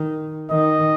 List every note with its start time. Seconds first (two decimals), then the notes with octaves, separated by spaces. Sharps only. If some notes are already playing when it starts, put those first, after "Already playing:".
Already playing: D#3
0.50 D#3 D#5